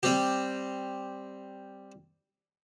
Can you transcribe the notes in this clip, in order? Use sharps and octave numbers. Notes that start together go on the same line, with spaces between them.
G3 C4 G4